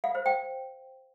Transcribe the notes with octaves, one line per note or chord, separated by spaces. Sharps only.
F5
C5
G5